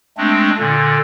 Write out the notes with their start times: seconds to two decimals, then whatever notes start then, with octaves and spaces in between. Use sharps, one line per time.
0.17 G#3 A3 C4 D4
0.59 A#2 D3